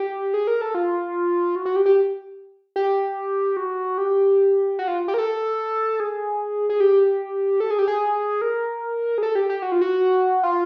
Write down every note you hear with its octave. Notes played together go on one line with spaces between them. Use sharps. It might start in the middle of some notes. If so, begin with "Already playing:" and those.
Already playing: G4
G#4
A#4
A4
F4
F#4
F#4
G4
G4
G4
F#4
G4
F#4
F4
G4
A#4
A4
G#4
G#4
G4
A4
G#4
G4
G#4
A#4
G#4
A4
G4
G4
F#4
F4
F#4
F4